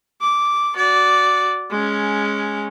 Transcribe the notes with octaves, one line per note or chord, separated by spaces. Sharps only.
D6
F#4 D5
G#3 C#4